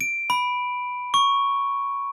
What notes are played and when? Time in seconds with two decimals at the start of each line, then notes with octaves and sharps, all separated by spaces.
0.01 D7
0.30 B5
1.14 C#6